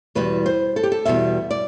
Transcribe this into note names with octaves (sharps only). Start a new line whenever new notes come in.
E2 B2 G3 B4
C5
A4
G4
A4
E2 B2 G3 E5
D5